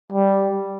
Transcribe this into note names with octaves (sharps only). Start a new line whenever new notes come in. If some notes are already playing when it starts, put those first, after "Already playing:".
G3